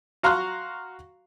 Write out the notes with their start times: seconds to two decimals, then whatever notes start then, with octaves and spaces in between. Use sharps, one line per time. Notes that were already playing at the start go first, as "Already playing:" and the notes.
0.23 F#4 F5 A#5 C6 C#6 F#6